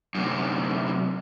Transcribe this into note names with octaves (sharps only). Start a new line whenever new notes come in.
F#2 C3